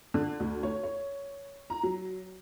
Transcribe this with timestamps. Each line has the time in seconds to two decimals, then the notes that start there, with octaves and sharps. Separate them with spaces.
0.14 D3
0.40 D2
0.63 C#5
0.83 C#5
1.70 A#5
1.83 F#3